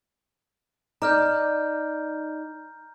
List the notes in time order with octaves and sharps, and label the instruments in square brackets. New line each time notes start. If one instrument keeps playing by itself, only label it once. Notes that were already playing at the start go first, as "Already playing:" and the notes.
[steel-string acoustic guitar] D#4 D5 [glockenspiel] A#5 F6 G6